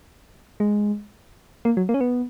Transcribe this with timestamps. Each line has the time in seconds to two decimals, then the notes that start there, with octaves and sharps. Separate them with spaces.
0.60 G#3
1.65 A#3
1.77 F#3
1.89 A#3
1.94 C#4
2.01 B3